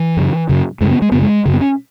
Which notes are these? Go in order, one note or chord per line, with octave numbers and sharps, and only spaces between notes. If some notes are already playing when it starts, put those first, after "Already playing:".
Already playing: E3
F#2 C#3
F#2 C#3
F#2 C#3 G#3
B3
G#3
F#2 C#3 B3
G#3
F#2 C#3
B3
C#4